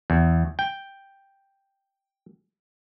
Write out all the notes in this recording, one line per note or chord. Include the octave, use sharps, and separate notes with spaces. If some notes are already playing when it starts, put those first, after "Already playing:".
E2
G5